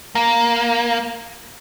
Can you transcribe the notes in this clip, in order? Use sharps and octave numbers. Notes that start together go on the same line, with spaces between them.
A#3